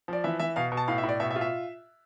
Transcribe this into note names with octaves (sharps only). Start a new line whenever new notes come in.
F3 D5
E3 E5
E3 E5
B2 F5
B2
A5
A2 F5
E5
A2
D5
B2 E5
E5
F4
E5